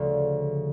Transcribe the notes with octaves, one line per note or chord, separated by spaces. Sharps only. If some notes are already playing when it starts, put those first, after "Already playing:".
Already playing: D2 C#3 F3